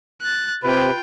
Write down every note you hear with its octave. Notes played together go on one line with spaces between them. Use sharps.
F#6 A6
C3 F4 B4 G5